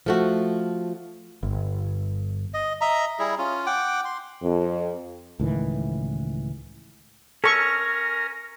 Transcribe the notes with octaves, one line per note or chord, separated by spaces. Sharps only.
F3 A3 F#4
G1
D#5
D#5 E5 A#5
G3 E4 G#4
C#4 F4
F#5 G5 D6
C6
F2
C#2 A2 D#3 E3
C#4 A4 A#4 C#6